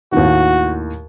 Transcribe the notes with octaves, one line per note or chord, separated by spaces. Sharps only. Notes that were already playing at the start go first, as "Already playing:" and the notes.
D#2 A2 D#3 F#4